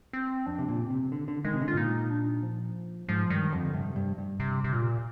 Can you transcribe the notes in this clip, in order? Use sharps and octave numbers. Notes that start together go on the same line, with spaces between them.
C4
F2 D4
C3
A#2
C4
C3
D3
D3
D#3 G#3
C3
D3
F4
G#2
A#2 D#4
D4
F3
G#2 F3
G2 D#3
F2 D3
G2 C3
G2
G2
C3
C3
A#2